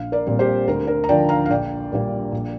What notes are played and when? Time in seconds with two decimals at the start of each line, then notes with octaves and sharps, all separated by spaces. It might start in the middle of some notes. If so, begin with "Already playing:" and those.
Already playing: A#1 F5
0.12 A#4 D5
0.26 A#2 G3 C4
0.39 G4 C5
0.68 D2 A#4
0.87 A#4
1.04 A#5
1.09 D3 F3 D4 D5 G5
1.29 F5 A#5
1.46 F5
1.50 A#1 D5 G5
1.92 A#2 G3 A#3
2.32 A#1